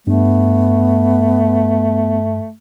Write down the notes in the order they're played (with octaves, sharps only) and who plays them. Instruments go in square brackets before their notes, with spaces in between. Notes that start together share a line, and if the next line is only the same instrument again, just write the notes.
[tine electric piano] G2 [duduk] A3 [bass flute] B3